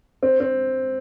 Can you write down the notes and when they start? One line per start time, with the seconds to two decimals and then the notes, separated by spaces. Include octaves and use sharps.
0.23 C4
0.40 C4